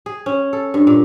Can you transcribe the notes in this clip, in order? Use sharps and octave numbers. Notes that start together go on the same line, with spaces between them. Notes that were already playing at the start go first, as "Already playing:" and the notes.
G#4
C#4
A4
G2
A#2